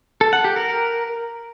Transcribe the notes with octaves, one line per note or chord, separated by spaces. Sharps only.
A4
F#5
G4
A#4